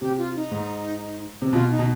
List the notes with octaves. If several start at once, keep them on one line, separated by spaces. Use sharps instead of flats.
C3 G4
F4
D#4
G#2
C3
B2 F4
D#4
B2